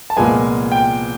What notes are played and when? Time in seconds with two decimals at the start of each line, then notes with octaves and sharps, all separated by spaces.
0.10 A5
0.16 C2 A#2 F3 G#3 B3 G#5
0.72 G5